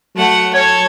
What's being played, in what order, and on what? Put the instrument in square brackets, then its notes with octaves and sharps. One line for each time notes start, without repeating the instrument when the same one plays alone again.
[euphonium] F#3 [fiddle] A3 F#5
[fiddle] A4 [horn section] C#5